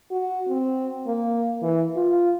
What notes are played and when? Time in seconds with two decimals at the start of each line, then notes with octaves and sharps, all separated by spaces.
0.11 F#4
0.49 C4
1.07 A#3
1.62 E3
1.96 F4